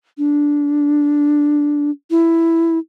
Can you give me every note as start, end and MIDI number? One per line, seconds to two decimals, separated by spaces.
0.18 1.90 62
2.11 2.79 64